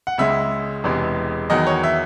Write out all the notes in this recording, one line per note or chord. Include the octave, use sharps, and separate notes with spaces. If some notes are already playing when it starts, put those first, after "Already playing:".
F#5
C#2 C#3 G#3 E5
E1 E2 C3 E3 G#3
E2 D#3 F#3 D#5
C#5
E5